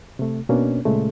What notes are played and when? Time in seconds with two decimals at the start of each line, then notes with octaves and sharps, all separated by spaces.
0.19 C3 A3
0.49 B2 A#3 C#4 D4
0.85 A#2 C#3 G#3 A3